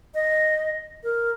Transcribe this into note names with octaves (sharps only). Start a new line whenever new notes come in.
D#5
A#4